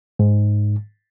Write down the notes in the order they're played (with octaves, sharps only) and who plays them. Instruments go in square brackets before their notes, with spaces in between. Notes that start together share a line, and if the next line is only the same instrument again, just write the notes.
[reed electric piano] G#2